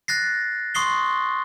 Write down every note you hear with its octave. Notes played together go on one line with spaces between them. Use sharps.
F#6 A6 A#6 C7
C6 C#6 D#6 C7 G7